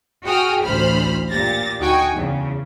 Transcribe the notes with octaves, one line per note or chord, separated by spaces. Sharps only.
F#4 G#4 G5 D#6 F6
A1 D2 C5 B5 F6
A#2 G4 A6 A#6
D2 D#4 F#4 G5 G#5 C#6
E2 C#3